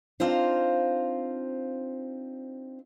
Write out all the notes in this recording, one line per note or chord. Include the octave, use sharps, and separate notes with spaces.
C4 D4 D#4 F4 C5 F5